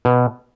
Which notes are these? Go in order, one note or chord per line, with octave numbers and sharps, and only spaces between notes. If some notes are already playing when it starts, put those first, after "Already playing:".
B2